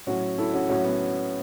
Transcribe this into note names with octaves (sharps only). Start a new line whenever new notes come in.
A2 F#3 C#4 F#4
E4 A4
C#4 F#4
A2 F#3 C#4 F#4
B3